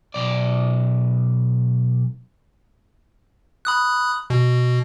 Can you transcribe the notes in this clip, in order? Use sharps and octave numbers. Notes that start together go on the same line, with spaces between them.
B1 D5
B5 D#6 F#6
B2